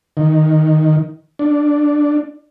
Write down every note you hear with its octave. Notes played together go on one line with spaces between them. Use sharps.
D#3
D4